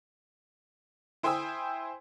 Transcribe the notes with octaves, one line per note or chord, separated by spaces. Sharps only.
E4 C5 G5 G#5 D#6 E6